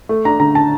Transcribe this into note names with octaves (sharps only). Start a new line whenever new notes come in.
A3
D4 A#5
D3 A#5
A5